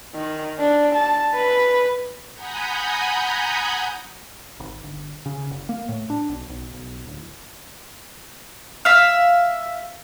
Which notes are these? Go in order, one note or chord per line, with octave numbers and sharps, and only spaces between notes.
D#3
D4
A5
B4
F#5 G#5 A#5 B5 D#6 G6
G#1
G1
C#3
F#1
A#3
A2
D4
B1
B1
B1
D1
E5 F5